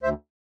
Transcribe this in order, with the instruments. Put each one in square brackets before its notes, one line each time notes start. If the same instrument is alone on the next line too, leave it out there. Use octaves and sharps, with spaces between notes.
[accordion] D2 C5 E5